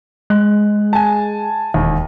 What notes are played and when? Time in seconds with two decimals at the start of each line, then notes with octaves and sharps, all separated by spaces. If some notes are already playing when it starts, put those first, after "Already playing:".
0.30 G#3 F#6
0.93 G#5 A5
1.74 E1 D#2